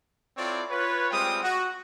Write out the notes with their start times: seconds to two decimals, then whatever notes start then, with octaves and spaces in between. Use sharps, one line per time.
0.37 C4 E4 F4 A4 C#5 D5
0.70 F4 B4 C#5
1.11 G3 G#3 C4 F4 G5 D#6
1.43 F#4